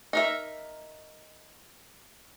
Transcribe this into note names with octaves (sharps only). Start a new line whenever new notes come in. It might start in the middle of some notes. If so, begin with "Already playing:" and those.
D#4 A#4 E5